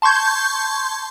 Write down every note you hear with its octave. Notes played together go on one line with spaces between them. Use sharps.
A5 C6 C#6 G6 G#6